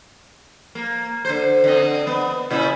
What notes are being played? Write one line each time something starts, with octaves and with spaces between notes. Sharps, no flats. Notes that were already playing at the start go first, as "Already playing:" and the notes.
A#3
D3 C5
D3 C4 D#5
B3
A#2 C#3 E4